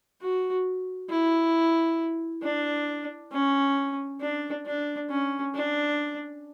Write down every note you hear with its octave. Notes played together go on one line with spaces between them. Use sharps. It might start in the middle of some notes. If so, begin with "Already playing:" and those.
F#4
E4
D4
C#4
D4
D4
C#4
D4